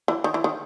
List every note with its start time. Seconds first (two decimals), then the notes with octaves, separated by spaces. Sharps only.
0.08 E3
0.24 D#3
0.34 E3
0.44 D#3